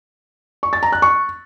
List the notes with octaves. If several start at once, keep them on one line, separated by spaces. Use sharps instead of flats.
C#6
A6
A#5
F#6
C#6